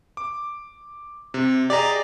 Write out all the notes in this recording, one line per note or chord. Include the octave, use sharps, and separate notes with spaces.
D6
C3
G4 G#4 D5 D#5 A#5